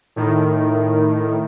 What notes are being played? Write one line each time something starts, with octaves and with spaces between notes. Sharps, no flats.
A2 D#3